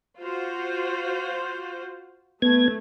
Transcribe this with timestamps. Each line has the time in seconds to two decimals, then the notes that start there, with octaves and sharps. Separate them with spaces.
0.18 F4 F#4 C5
2.42 A3 B3 G#6